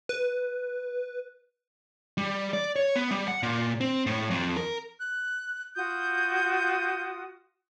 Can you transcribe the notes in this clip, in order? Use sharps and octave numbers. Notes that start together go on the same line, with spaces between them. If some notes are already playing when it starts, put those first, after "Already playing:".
B4
G3
D5
C#5
B3
G3
F#5
A#2
C4
A2
F2
A#4
F#6
F4 F#4 D#6 G6